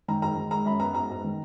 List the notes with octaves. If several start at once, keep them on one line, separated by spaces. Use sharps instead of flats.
D#3 A#5
G#2 A#5
D#3
G#3 A#5
F#2 B5
B3 A#5
G#2 A#5
G#2
D#3